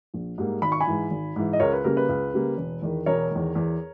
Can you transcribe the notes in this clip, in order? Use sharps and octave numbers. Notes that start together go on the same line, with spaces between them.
A#1
G#2 G3 A#3
G#1 B5
C#6
G#5 B5
G#2 E3
G#1
G#2 E3
D#5
C#2 A#4 C#5
B4
C#3 G3 A#3 A#4
B4
C#2
C#3 G3 A#3
E1
E2 D#3
E1 A#4 C#5
E2 D#3
E2